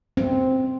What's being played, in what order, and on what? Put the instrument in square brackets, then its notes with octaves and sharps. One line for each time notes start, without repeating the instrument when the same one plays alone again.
[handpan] C4